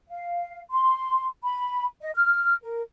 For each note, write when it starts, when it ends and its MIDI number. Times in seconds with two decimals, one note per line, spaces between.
0.09 0.60 77
0.70 1.27 84
1.43 1.85 83
2.01 2.10 75
2.15 2.55 89
2.63 2.81 70